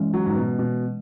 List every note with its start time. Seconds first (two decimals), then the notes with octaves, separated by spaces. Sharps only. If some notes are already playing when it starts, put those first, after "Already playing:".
Already playing: E3 G#3 C#4
0.14 F#3
0.26 G#2
0.36 B2
0.59 B2